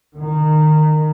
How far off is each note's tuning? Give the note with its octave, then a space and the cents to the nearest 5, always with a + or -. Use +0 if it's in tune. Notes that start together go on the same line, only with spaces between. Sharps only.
D#3 -20